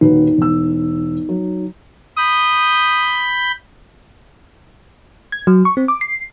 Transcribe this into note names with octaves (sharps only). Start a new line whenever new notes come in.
D#1 D#4 F#4 B4
E1 E6
F#3
B5 D#6 G6
G#6
F#3
C#6
C4
D6
C7